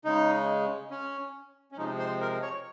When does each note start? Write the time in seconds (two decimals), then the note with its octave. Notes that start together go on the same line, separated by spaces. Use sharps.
0.05 C#3 G#3 D#4
0.91 C#4
1.72 C#4
1.77 C3 F3 G#3 D#4
1.99 C5
2.21 A#4
2.42 C#5